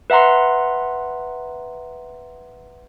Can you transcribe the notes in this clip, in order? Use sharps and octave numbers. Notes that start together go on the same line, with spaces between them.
B4 E5 F#5 A#5 C6